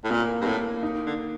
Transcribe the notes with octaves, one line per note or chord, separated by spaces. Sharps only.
A2
A#2 A#3
G2
A2 A#3
D#4
D3